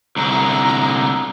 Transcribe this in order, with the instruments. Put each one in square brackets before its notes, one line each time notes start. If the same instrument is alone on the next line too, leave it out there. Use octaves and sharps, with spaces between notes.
[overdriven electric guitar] C2 D3 [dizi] A#5